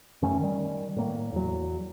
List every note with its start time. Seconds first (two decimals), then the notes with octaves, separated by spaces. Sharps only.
0.22 F#2 D#3 A3 C#4
0.41 D#3 G3
0.96 A2 A#3
1.32 E2 F#3